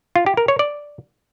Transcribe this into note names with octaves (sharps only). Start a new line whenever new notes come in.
F4
G4
A#4
C#5
D5